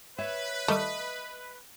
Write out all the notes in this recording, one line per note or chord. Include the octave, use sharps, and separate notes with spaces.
B4 C#5 E5
D#3 G3 A3 D#5 C#7